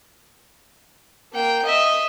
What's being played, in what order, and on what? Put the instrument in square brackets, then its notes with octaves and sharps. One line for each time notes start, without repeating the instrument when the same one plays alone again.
[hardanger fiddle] A#3 G5
D#5 E5